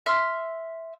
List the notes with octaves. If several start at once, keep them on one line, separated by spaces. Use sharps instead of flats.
E5 C6 F6